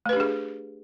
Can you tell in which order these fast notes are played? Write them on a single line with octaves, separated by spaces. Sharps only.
A3 B4 G4 D4 G#4